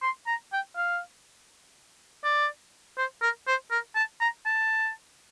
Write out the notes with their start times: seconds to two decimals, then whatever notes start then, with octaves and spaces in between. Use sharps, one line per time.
0.02 C6
0.27 A#5
0.52 G5
0.77 F5
2.24 D5
2.97 C5
3.22 A#4
3.47 C5
3.71 A#4
3.95 A5
4.20 A#5
4.45 A5